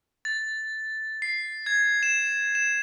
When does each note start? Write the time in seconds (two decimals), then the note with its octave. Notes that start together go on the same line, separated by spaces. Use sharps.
0.25 A6
1.22 C7
1.66 G#6
2.03 E7
2.55 E7